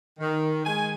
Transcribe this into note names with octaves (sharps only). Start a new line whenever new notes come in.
D#3
G#3 G#5